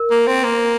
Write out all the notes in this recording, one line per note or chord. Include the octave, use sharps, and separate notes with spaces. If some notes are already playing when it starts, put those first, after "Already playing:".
Already playing: A#4
A#3
C4
A#3